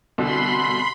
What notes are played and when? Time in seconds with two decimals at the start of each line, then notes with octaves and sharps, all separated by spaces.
0.18 C2 B2 D3 B5 C6